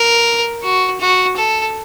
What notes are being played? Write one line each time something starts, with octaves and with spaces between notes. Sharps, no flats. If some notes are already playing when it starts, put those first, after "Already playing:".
Already playing: A#4
F#4
F#4
A4